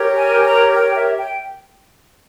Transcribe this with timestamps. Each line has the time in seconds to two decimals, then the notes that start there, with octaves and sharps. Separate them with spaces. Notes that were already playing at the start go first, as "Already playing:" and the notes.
Already playing: G4 A#4 C#5
0.18 G#5
0.45 A#5
0.75 G5
0.96 E5
1.17 G5